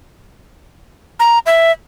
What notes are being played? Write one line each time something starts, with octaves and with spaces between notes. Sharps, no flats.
A#5
E5